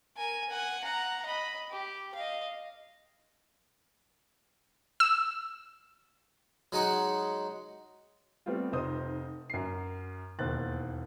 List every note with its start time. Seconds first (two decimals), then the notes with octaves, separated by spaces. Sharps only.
0.17 A#4 G#5
0.50 F#5 G#5
0.84 F#5 A#5
1.26 D#5 B5
1.71 G4
2.15 D#5 F5
5.00 E6
6.72 F#3 G#3 D#4 F#5
8.46 G3 A3 B3 C4 F4
8.72 F1 D#4 C5 D#6
9.50 F#2 C7
10.39 E1 D#2 C5 F#6 A6